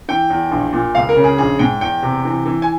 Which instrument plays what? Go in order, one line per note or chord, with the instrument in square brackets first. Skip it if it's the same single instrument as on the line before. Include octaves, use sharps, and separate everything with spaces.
[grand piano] E3 G5
E2
A#1
A#2
C#2 F5
A#4
C#3
G#4
A#1 G#4
G#2 G5
E2 G5
C3
E3
E3
G#5